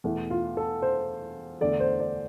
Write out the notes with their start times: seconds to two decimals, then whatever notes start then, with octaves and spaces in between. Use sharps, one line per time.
0.04 E2 B2 A3 E4
0.30 F4
0.57 A4
0.82 C5
1.61 E2 D3 A3 D5
1.80 C5
2.00 D5